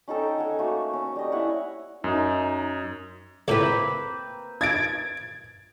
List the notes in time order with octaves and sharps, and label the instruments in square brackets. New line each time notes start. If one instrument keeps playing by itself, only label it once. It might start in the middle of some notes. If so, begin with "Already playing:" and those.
[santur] C#4 D#4 A4 G5
C#5 F#5 G#5
A3 A#3 F#4
C#4
G3 D#5
E4 C#5 F#5 G#5
[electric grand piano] F#2 [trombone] D#4
[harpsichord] C#2 A2 [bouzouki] A#3 C4 B4
[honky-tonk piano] G#6 A6 D7